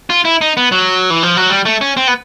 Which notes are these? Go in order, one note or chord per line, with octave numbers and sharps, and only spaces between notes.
F4
E4
D#4
B3
F#3
E3
F3
F#3
G3
A3
C#4
C4
B3